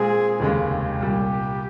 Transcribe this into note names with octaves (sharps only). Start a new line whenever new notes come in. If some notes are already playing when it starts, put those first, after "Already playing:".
Already playing: A#2 G#3 C4 G#4
F1 D#2 C#3 G#3 G4
C2 A#2 G3